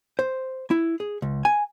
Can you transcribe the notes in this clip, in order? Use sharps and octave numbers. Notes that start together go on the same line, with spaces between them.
C5
E4
G#4
C#2
G#5